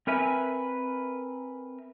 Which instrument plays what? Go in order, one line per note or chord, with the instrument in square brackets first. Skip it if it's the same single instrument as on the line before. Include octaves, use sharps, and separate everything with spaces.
[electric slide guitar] C4 A#4 B4 E5 G#5